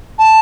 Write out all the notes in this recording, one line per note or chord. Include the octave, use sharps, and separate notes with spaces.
A5